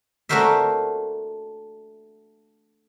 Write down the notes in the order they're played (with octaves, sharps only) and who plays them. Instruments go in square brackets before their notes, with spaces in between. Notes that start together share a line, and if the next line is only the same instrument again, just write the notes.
[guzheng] A3 D4 F#4 A#4 C5 E5